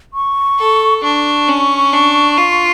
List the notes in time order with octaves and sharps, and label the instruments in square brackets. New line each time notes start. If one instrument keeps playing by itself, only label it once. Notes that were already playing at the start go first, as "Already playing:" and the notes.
[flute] C#6
[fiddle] A4
[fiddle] D4 [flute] C#6
[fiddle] C#4
D4
F4